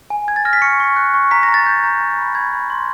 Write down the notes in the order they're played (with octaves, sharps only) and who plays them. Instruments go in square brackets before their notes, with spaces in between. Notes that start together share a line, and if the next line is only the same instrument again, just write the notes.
[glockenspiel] G#5
G#5 G#6
A6
F6 A#6
B6
C#6 C#7
C#6
F#6
C#6
A#5 B6
A#6
A#5
A6
G6
A#5
G#5
B5
B5 G#6
B5
C6